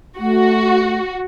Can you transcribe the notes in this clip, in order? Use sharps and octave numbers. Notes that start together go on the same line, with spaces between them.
A3 F#4